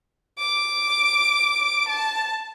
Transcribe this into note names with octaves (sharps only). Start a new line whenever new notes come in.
D6
A5